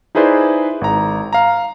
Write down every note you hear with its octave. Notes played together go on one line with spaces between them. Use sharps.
D#4 E4 G#4 B4 C5 D5
G#1 A#5
F5 A#5